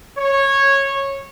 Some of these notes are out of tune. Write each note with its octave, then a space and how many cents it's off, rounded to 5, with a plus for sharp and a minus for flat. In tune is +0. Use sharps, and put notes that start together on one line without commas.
C#5 -15